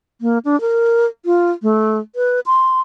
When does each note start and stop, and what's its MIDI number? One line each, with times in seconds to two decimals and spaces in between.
0.21 0.38 58
0.45 0.59 62
0.61 1.06 70
1.25 1.51 65
1.63 1.98 57
2.16 2.40 71
2.46 2.81 84